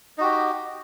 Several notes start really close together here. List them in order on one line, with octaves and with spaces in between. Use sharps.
D#4 F#4 G4